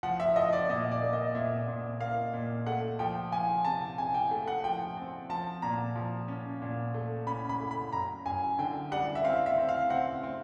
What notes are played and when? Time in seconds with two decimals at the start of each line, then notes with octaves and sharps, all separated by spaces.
0.03 F3 F#5
0.20 E5
0.36 F3 D#5
0.53 D5
0.69 A#2 D#5
0.91 D5
1.02 A#3
1.13 D#5
1.35 A#2 E5
1.68 A#2
2.00 A#3 F5
2.33 A#2
2.66 A3 F#5
2.99 F3 G5
3.32 F3 G#5
3.65 C3 A5
3.98 C3 G#5
4.14 G5
4.31 A3
4.48 F#5
4.64 F3 G5
4.97 C4
5.29 F3 A5
5.62 A#2 A#5
5.96 F3
6.28 C#4
6.62 A#2
6.94 A3
7.27 C#4 B5
7.49 B5
7.60 A3
7.71 B5
7.93 F#2 A#5
8.26 F#2 G#5
8.59 D3 G5
8.91 G3 F#5
9.15 E5
9.24 C4 F5
9.46 E5
9.58 C4
9.69 F5
9.90 C4 F#5
10.23 C4